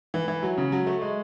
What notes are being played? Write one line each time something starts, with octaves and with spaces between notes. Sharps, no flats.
E3
E3
F#3
C#3
F#3
A3
G#3